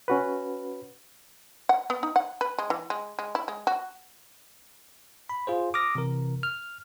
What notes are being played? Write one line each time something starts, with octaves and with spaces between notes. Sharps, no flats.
C#4 F#4 B4
F#5
B3
D#4
F#5
B4
G#3
E3
G#3
G#3
E4
G#3
F#4
B5
F4 G#4 C5
D6 D#6 F6 A#6
C3 E3 A#4
F6